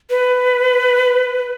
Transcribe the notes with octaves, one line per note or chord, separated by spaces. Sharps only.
B4